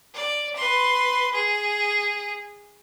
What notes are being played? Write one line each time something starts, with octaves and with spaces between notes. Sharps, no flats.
D5
B4 C6
G#4